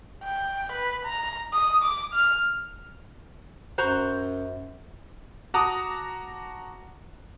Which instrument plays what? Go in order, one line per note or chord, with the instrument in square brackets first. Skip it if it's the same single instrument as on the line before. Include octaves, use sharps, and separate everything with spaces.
[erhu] G5
B4
A#5
D#6
D6
F6
[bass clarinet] F#2 [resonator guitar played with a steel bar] F#4 C5 A#5
[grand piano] F#4 A5 A#5 D6 D#6